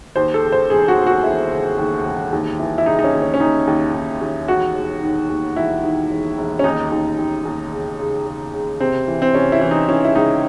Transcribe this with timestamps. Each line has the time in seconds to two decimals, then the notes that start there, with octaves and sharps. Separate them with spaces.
0.16 D#2 C5
0.34 A4
0.43 C#3
0.52 C5
0.70 E1 G#4
0.88 F#4
0.97 E1
1.07 F#4
1.23 E1 E4
1.51 C#3
1.79 D#2
2.05 E1
2.33 D#2
2.59 E3
2.78 E4
2.86 C#3 D#4
2.99 D#4
3.04 C#4
3.14 D#2
3.22 C#4
3.34 C#4
3.40 D#2 D#4
3.67 D#2
3.94 D#2
4.21 D#2
4.48 E1 F#4
4.75 E1
5.02 D#3
5.29 D#2
5.56 E1 E4
5.84 D#3
6.11 E1
6.38 E1
6.59 C#4
6.64 D#2 D#4
6.92 D#2
7.18 D#2
7.45 D#2
7.72 C#3
7.99 C#3
8.27 C#3
8.54 C#3
8.80 C3 C4
9.08 E3
9.22 C4
9.35 C3 C#4
9.52 E4
9.61 E3
9.71 D#4
9.89 E3 C#4
10.05 E4
10.15 C#2 D#4